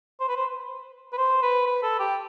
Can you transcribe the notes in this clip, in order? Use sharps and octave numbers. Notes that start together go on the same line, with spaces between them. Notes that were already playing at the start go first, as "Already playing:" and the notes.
C5
B4
C5
B4
C5
B4
B4
A4
G4